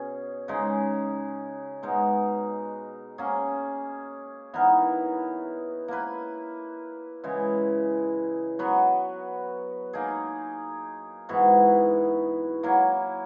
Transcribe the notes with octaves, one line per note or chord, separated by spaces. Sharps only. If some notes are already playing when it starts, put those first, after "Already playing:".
Already playing: B2 C#4 G#4
C#3 G#3 D#4
B2 G#3 D#4
A#3 C#4 G#4
E3 B3 D#4 A#4
A#3 E4 B4
C#3 E3 G#3
F#3 B3 F#4 B4
A#3 D#4 G#4
G#2 E3 B3 F#4
F#3 A#3 E4